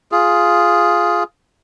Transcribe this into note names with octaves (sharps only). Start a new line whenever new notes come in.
F4 G#4